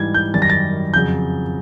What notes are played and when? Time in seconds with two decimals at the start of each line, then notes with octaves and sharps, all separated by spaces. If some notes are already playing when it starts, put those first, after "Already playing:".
Already playing: G#2 E3 G3 G#6
0.14 G6
0.34 F#2 D#3 G3 A6
0.42 A#6
0.50 A6
0.94 F2 C#3 F#3 G6